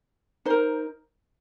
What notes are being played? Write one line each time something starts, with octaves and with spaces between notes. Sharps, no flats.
D#4 A#4 C5